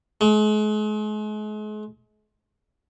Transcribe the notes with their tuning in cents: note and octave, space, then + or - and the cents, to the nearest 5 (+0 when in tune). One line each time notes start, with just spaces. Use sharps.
G#3 +40